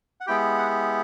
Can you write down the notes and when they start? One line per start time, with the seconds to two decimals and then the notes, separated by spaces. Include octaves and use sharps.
0.21 F#5
0.27 G#3 B3 E4 G4 G5
0.58 F#5